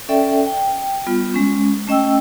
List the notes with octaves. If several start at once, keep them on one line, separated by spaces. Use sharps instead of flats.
C#4 A4 D5 E5 G5
G5
G3 B3 F4
G#3 C#4
A3 C#4 D#5 G5 E6